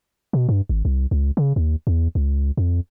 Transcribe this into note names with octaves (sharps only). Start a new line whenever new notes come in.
B2
G2
G#1
C2
C#2
C#3
D#2
E2
C#2
F2